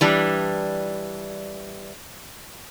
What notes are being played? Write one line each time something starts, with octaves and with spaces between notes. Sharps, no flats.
E3 G3 D4